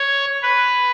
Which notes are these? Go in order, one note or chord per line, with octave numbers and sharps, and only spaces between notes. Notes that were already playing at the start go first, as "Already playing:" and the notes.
Already playing: C#5
B4